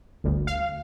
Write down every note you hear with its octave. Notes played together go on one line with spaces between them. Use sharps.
G1 D2
F5